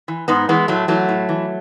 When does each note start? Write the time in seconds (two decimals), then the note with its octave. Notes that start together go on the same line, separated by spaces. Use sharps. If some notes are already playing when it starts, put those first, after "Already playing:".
0.08 E3
0.28 G#2 B3 D#4
0.49 E3 G#3 B3
0.68 A2 F#3 A3
0.88 E3 F#3 A3
1.09 A2
1.29 E3